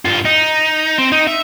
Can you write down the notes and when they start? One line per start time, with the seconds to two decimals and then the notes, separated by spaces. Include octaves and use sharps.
0.05 G2 F4
0.25 D#4
0.98 C4
1.12 D#4
1.27 E5